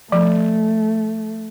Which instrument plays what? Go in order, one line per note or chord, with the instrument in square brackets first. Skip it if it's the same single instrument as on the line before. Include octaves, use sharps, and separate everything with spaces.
[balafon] F3 [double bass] A3